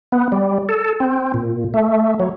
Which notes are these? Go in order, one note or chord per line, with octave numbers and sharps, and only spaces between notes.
B3
G3
A4
C4
A#2
A3
F#3